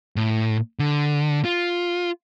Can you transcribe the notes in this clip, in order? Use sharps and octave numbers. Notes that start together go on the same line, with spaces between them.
A2
D3
F4